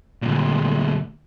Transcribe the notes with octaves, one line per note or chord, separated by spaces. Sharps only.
D2 A#2